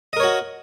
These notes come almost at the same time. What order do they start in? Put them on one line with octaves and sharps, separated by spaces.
D#5 A#4 C#5 F#4